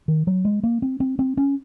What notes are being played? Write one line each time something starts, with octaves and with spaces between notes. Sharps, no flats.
D#3
F#3
G#3
A#3
C4
C4
C4
C#4